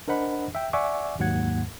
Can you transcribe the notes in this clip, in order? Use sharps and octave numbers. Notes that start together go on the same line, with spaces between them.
D4 A#4 C5 D#5 F#5 B5
E5 G5
D5 E5 F#5 G#5 C#6 D6
D#2 G#2 F#3 A#3 F#5 G#6